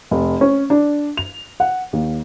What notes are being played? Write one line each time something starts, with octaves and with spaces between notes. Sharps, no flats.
F1
C#4
D4
F7
F#5
D#2